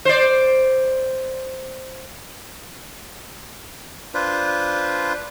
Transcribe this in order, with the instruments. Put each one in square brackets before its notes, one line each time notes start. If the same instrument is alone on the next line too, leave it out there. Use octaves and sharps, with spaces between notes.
[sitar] C5 D5
[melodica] D4 F4 B4 C5